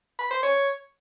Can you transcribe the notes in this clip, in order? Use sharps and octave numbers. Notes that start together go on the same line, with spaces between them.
B5
C5
C#5